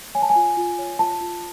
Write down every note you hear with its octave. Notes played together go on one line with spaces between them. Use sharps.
C#5 G#5
A5
G#5
F4
F4
C#5
F4 A5
F4